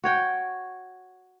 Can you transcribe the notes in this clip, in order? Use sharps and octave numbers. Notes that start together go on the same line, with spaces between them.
F#4 C#5 G5